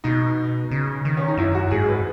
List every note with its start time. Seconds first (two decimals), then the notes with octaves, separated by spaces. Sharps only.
0.04 B2 D#4
0.71 C#3
1.05 D#3
1.17 C#4
1.28 D#4
1.37 F#2 E4
1.55 F#4
1.71 G#2 G#4
1.88 B4